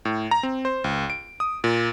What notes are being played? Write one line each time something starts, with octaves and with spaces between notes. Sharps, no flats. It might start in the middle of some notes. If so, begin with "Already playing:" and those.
A2
A#5
C4
C5
C#2
D7
D#6
A#2